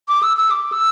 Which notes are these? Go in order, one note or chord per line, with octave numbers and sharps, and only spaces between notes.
D6
E6
E6
D6
E6